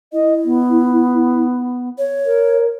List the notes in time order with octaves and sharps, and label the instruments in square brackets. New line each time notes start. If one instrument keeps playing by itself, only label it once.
[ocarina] E4 [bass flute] D#5
[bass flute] B3
[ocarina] C#5
[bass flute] A#4